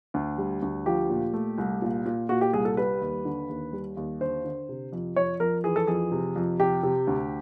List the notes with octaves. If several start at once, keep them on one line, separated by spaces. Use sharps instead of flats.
D2
G3
D2
F3 G4
A#2
A3
C2
A#2
A#2
A#2 F#4
G4
C2 G#4
A4
G3 B4
D#2
D3
D#2
G3
D#2
D3 C5
D3
C3
F2
F2 C#5
F2 A#4
E3 G#4
A4
F2 G#4
C3
F2
C3 G4
C3
D2